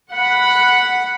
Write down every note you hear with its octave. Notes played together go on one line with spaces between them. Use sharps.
F#5 B5